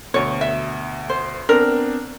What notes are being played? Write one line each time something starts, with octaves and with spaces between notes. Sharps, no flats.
D2 B2 C#5
E5
C5
B3 C4 D4 A#4